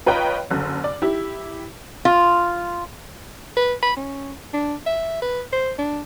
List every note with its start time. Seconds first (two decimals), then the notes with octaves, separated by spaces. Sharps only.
0.06 F4 B4 C#5 D#5 G5 A#5
0.51 F#1 D3
0.84 D5
1.02 E4 G4
2.05 F4
3.57 B4
3.83 B5
3.97 C#4
4.53 D4
4.87 E5
5.22 B4
5.52 C5
5.78 D4